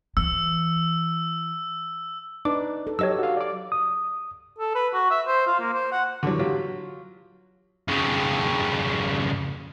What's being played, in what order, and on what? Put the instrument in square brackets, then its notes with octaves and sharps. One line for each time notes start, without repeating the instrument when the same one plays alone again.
[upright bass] E3 [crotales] E6
[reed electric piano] D4 [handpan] D#4 B4 [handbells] D6
[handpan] A4
[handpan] F#3 G4 A4 [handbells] C#5 D#5 E6
[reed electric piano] F#4 F5
D5 D6
[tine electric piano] D#6
[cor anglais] A4
B4
F#4
E5
C5
F4
A#3
C5
F#5
[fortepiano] D3 E3 F#3
F#3 F4 G4
[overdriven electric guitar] F2 C#3